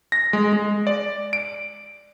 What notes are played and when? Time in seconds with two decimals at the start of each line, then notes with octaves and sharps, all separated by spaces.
0.12 A#6
0.33 G#3
0.53 G#3
0.87 D5
1.33 D7